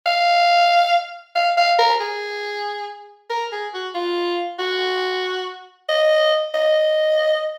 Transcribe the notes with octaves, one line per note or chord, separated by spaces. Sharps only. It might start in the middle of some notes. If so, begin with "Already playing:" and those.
F5
F5
F5
A#4
G#4
A#4
G#4
F#4
F4
F#4
D#5
D#5